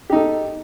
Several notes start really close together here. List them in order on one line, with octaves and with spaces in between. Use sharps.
G4 D#4 A4